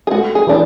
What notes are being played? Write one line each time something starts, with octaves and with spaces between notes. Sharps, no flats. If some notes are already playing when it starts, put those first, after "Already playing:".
G#4
A3 F#4
G#4
E3 D4